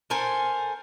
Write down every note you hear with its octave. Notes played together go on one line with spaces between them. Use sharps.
A4 A#4 C5 G#5